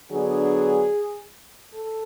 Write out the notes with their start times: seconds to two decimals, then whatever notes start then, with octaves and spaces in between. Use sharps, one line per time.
0.11 D3 F#3 B3 D4 G#4
1.75 A4